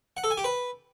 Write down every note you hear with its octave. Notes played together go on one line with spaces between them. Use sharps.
F#5
A4
G#5
G4
B4